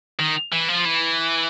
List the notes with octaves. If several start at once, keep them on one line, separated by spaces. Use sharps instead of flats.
D#3
E3
F3
E3